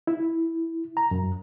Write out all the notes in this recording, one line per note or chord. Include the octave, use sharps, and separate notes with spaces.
E4
A#5
F#2